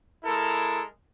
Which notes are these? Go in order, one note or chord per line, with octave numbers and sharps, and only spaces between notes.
G#3 E4 A4 A#4